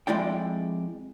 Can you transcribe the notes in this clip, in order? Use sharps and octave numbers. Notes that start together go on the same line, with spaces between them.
F2 G#3 E4 D5 G5